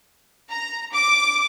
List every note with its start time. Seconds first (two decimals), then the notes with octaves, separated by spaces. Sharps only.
0.50 A#5
0.93 D6